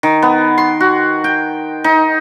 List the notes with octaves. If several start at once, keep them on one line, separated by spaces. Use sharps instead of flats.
D#3
B3
C6
F#4
G5
D#4